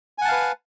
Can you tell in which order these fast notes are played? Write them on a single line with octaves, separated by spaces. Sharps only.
G#5 F#5 A5 F5 B4